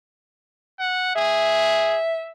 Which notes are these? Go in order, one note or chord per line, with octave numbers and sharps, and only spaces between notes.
F#5
G#4 E5